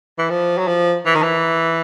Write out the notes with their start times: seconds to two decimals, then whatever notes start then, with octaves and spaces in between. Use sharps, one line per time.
0.18 E3
0.30 F3
0.58 F#3
0.68 F3
1.06 E3
1.15 D#3
1.23 E3